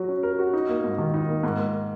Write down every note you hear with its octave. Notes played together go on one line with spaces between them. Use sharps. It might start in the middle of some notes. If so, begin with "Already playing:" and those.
Already playing: F#3 F#4
C#4
A#4
F#4
D#4
A#3
G#2
D#3
D#4
A#3
G#2
A#3